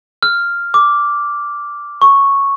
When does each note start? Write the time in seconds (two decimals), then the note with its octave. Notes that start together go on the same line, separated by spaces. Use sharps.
0.23 F6
0.74 D6
2.02 C#6